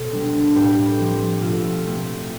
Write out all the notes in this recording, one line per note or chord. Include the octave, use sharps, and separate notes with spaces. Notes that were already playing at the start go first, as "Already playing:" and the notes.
Already playing: B2 A4 C5
G3 D4
A2 G4 B4
F3 C4
B2 F4 A4
A3 C4